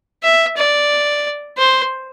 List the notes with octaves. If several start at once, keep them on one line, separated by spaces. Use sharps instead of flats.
E5
D5
C5